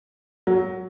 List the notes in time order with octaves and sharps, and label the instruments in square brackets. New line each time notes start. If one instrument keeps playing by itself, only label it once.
[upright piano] F#3